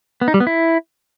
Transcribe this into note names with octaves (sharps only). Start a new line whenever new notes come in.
B3
D#4
G3
B3
E4